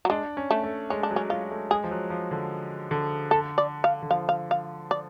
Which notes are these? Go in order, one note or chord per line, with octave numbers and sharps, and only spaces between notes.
F#3
G#3 D4
C#4
A3
A3
G#3 C#4
D4
F#3
C#4
F#3 F4
A3
G#3 G#4
F3
F#3
F3
D3
D3
A4
D5
F5
D3
F3 F5
F5
F5
D5